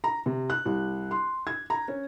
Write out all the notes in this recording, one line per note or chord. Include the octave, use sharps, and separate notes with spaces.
A#5
C3
F#6
C2
C6
G#6
A#5
C#4